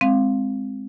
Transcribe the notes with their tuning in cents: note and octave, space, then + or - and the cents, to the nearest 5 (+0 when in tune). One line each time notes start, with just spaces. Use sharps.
G#3 -5 C4 +0 F5 -5